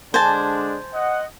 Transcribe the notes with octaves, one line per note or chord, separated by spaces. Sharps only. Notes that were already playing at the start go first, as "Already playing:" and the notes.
D3 G#3 D4 C5 G#5 A5
D#5 F#5